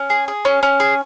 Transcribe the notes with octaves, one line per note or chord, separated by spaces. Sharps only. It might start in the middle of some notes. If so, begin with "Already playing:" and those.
Already playing: C#4
G#4
G#4
C#4
C#4
G#4